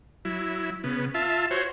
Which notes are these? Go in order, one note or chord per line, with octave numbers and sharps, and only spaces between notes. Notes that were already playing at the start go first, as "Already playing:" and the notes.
F#3 E4
C#3 B3
F4 E5 A5
F#4 C5 C#5